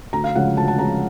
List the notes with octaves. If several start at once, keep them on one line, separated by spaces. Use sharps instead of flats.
D2 A#5
F5
C#3 F3 G#3 F#5
D2 A5
A5
C#3 F3 G#3 A#5